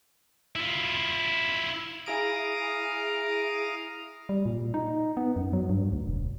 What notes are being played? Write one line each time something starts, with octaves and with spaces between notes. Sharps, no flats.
E4 F4
E4 G#4 F5 A#5 D#6 D7
G3
A#2
D#4
B3
F#2
F#3
G2
D2
E1